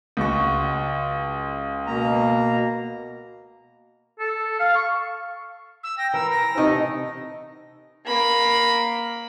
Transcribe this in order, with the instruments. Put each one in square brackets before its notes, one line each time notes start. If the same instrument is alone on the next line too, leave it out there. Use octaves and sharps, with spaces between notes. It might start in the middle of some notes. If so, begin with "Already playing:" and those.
[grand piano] C#2 F#4 C#6
[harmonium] B2 A#3 A#5
[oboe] A4
F5
C#6
[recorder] E6
[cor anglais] G5 [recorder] A#6
[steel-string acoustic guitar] E3 [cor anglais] A#4 [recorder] E6
[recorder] A#6
[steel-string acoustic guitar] C3 D#4 D#5 [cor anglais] A3
[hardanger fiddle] A#3 B5